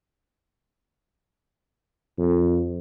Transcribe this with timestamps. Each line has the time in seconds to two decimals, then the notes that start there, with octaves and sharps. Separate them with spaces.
2.18 F2